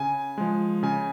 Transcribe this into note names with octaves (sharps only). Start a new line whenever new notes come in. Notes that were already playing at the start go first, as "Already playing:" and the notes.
Already playing: C#3 G#5
F3 G#3
C#3 G#5